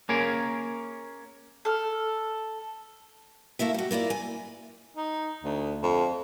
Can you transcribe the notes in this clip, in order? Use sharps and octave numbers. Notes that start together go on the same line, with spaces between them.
A#3 C#4 G#4 A#4
A4 F6
A3 A#3 E4 E5
G3 F#4
A#3 E4 F4 D5
G#5
D#4
D2
F2